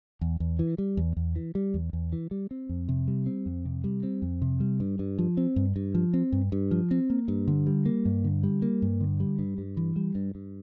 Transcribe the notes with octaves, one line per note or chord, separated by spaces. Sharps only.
E2
E2
E3
G3
E2
E2
E3
G3
E2
E2
E3
G3
C4
F2
C3
G3
C4
F2
C3
G3
C4
F2
C3
G3
G2
G2
F3
C4
G2
G2
F3
C4
G2
G2
F3
C4
A#3
G2
D3
G3
A#3
G2
D3
G3
A#3
G2
D3
G3
G2
G2
E3
G3
G2
G2